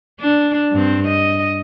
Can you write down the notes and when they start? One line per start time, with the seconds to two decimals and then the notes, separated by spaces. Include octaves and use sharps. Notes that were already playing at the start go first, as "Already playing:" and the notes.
0.21 D4
0.71 G2 C4
1.07 D#5